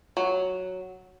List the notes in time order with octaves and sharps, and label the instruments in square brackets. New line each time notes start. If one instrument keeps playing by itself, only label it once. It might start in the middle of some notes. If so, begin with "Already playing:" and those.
[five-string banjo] F#3